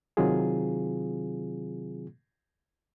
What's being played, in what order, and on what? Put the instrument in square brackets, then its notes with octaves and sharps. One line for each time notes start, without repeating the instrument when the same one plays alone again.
[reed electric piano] C3 D#3 F#3 C4 F4 G#4